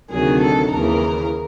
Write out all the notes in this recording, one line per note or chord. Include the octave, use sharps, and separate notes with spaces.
D2 C3 D#3 F#3 G#4
A4
D#2 C#3 E3 A#4